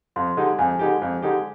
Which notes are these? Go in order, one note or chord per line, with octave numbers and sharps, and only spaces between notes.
F2 C6
D3 G#3 D#4 G4
F2 G#5
D3 G#3 D#4 G4
F2
D3 G#3 D#4 G4